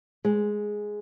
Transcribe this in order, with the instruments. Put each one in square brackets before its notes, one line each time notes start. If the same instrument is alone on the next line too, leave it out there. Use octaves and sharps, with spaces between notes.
[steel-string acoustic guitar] G#3